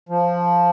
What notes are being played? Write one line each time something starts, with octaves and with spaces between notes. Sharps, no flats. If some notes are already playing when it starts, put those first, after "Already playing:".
F3